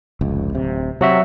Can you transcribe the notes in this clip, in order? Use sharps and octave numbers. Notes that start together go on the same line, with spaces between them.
F1 C#2
D1 C3
C3 F#3 F#4 E5